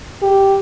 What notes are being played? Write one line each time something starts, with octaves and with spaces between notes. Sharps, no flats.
G4